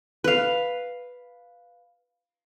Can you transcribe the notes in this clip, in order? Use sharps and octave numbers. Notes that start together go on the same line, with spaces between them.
B4 F5